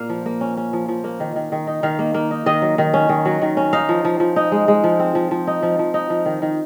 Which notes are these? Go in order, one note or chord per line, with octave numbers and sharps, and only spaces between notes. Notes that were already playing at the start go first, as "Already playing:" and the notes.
Already playing: A#2 A#3 F5
F3
A#3
C#4
C#4
F3
F3
A#3
D#3
D#3
D#3
D#4
D#3 F5
A#3
A#3
D#4
D#3 D#5
F#3
D#3
C#4
D#3
F#3
D#3
C#4
D#4 F5
F3
F3
F3
D#4
G#3
G#3
F3
C4
F3
F3
D#4
F3
F3
D#4
F3
D#3
D#3